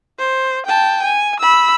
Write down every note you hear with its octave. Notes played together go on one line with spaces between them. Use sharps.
C5
G5 A5
G#5
B5 E6